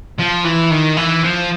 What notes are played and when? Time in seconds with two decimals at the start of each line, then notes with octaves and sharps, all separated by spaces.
0.19 F3
0.45 E3
0.71 D#3
0.97 E3
1.24 F3